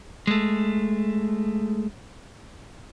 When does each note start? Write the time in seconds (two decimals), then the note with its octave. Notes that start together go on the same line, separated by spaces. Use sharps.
0.27 G#3 A3